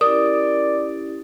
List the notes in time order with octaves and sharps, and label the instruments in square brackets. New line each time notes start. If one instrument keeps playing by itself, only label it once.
[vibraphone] C#4 E4 G4 [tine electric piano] A#4 [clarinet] D5 [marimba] D#6